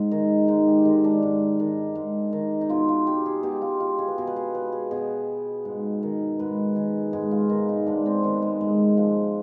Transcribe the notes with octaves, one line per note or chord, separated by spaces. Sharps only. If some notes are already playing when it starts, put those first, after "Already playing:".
Already playing: G#2
D#3 G#3
G#2 D#4
G4
D#3 G#3
D4
G#2
D#3
G#2
D#3
D#4
B2 F4
F4
G4
G#4
B2 G4
F4
F4
G#4
B4
B2 G#4
B4
G#4
B4
G#4
B2 G#4
G#2
D#3
G#2 B4
D#3 G#4
G#2 G#4
F4
D#3
D#4
G#2 D4
C4
D#3 B3
G#3
G#2 G#3
F3